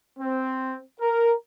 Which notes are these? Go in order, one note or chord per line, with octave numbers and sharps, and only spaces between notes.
C4
A#4